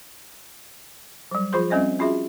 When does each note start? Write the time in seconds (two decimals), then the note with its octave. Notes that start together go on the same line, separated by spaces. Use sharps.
1.31 F#3 G3
1.53 F3 F4 G#4 C5 C6
1.70 G3 C4 C#4 D#5 E5
1.99 C#4 F4 F#4 G#4 E5